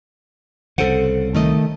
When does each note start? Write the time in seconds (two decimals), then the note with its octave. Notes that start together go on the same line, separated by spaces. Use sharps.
0.78 C2 C#3 A4 C5 F#5
1.35 D#3 A3 D#5